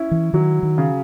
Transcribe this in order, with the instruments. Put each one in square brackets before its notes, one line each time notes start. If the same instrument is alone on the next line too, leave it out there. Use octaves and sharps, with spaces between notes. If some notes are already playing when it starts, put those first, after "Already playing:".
Already playing: [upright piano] C#4 E4
[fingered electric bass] E3
[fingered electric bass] D#3 [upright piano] F#3
[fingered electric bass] D#3
[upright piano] C#3